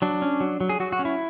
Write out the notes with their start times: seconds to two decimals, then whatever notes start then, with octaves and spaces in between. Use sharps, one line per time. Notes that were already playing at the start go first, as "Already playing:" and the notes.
0.02 F#3 D4
0.22 C#4
0.40 F#3
0.60 F#3
0.69 G#4
0.80 F#3 F#4
0.92 F#4
0.99 C#4
1.05 E4